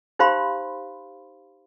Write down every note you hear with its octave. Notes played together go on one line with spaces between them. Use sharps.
D#4 G4 C5 F5 B5 C6